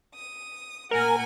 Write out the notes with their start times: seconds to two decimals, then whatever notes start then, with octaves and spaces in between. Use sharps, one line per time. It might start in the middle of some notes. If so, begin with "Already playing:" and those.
0.14 D#6
0.91 A#2 A#4 F#5 G#5